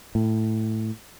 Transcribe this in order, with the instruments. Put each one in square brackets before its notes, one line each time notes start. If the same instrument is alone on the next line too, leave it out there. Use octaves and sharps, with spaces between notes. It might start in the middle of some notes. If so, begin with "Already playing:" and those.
[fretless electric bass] A2